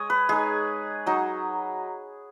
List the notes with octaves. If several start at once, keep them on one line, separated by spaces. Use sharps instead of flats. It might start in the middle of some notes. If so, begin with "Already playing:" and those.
Already playing: G#3 C#5 D#5
B4
G#3 D#4 G#4
F#3 D#4